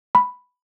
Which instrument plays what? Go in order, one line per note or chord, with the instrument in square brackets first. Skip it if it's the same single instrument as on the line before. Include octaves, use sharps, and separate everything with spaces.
[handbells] B5